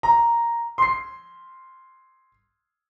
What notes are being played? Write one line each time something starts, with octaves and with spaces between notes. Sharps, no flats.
A#5
C6 C7